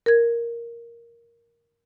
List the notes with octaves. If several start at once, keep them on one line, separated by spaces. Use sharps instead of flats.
A#4 G#6